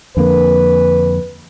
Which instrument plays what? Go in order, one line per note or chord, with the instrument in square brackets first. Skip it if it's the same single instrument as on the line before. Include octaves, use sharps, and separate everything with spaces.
[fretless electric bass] F2 D3 A#3 [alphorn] B4